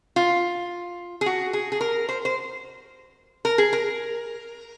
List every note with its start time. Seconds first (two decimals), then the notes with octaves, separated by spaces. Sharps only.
0.16 F4
1.21 G#4
1.26 F#4
1.53 G#4
1.72 G#4
1.81 A#4
2.09 C5
2.25 C5
3.45 A#4
3.58 G#4
3.73 A#4